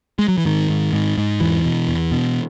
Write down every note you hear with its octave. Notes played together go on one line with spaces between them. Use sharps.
G#3
F#3
E3
G#2 D#3
G#2
G#2
G#2
E2 E3
B2
E2
B2